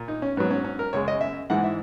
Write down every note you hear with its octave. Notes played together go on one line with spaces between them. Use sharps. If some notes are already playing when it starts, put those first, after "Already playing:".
Already playing: A#2
D#4
C#4
G#2 F#3 B3
C#4
C#4
A#4
F#2 C#3 G#3 C#5
D#5
E5
G#2 E3 G#3 F#5
E5